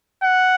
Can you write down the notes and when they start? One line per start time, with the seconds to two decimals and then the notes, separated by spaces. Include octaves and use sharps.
0.23 F#5